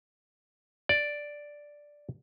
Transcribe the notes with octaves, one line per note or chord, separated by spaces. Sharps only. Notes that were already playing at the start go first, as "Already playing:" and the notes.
D5